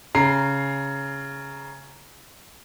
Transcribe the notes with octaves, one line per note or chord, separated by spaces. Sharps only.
C#3 A#5 C7